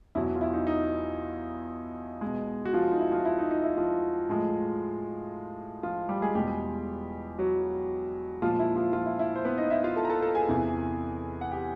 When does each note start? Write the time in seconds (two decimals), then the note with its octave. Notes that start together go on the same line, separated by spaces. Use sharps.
0.15 E2 B2 F#3 E4
0.35 F4
0.41 E4
0.54 D#4
0.67 D#4
2.21 G#3
2.26 B2
2.65 F#4
2.74 F3 F4
2.92 D#4
3.00 E4
3.12 F3 F4
3.25 E4
3.39 D#4
3.51 D#4
3.63 E4
3.77 F3 F4
4.29 A2 F3 G#3
5.83 F3 F4
6.09 G3 G4
6.22 G#3 G#4
6.35 E2 B2 G3 G#3 G4
7.38 F#3 F#4
8.42 A#2 F3 G#3 F4
8.59 E4
8.76 F3 F4
8.93 F3 F4
9.06 E4
9.19 E4
9.36 C5
9.44 B3 B4
9.58 D#4 D#5
9.70 E4 E5
9.84 F4 F5
9.96 A4 A5
10.05 A#5
10.10 A4 A5
10.22 A4 A5
10.35 G#4 G#5
10.48 E2 C3 E3
11.41 F#5
11.51 G4 G5